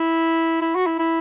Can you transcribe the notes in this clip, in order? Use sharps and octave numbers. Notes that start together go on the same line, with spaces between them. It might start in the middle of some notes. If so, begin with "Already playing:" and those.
Already playing: E4
E4
F#4
E4
E4